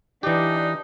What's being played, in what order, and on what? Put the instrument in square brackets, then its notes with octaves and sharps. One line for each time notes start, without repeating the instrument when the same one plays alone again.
[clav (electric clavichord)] E3 G4 [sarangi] D4 [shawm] D#4